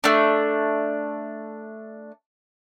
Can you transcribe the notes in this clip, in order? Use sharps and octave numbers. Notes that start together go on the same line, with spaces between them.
A3 D4